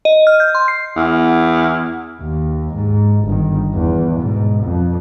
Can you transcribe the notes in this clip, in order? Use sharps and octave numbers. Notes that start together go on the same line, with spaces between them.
D#5
F6
G6
C6
C7
E2
D#2
G#2
G1 D#3
E2
G#2 B2
F2